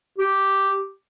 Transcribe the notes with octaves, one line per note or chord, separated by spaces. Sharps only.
G4